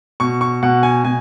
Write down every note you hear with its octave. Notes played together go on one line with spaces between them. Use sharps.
B2 C#6
C#6
B2 F#5
G#5
B2 G#5